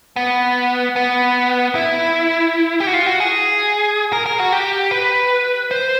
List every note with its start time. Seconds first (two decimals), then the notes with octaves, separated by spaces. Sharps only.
0.16 B3
0.96 B3
1.75 E4
2.80 G4
2.87 F#4
2.94 F4
3.06 F#4
3.20 G#4
4.13 A#4
4.26 A#4
4.39 F#4
4.52 G4
4.91 B4
5.71 C5